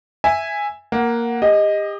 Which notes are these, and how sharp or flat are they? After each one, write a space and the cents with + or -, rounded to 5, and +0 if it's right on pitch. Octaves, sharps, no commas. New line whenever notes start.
E5 +0 G#5 -10
A#3 +0 F#5 +0
G4 +35 D#5 +0